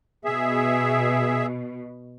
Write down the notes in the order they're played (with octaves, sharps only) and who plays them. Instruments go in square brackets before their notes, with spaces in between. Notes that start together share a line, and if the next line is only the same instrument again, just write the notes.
[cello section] B2 [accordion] G#4 E5